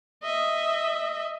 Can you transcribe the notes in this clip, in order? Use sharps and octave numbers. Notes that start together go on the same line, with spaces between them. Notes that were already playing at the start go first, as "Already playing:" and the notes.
D#5 E5